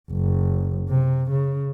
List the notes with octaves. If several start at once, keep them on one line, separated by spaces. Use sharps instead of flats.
F#1
C3
C#3